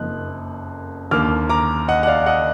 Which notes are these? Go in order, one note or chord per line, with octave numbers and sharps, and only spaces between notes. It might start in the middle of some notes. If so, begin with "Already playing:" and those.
Already playing: F#1 F2 F3 A#3 D#4 F#6
D#2 D3 F3 A#3 D6 F6
A#5 D6
D#5 F#5
F#5
D5 F5
D#5 F#5